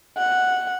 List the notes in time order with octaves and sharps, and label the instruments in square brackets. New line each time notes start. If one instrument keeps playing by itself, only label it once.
[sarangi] F#5